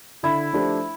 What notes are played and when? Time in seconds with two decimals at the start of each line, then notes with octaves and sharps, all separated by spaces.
0.23 D3 E4
0.53 F3 A3 D4 G4